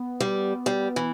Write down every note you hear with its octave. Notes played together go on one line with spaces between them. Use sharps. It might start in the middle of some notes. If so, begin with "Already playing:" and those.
Already playing: B3
G3
G3
E3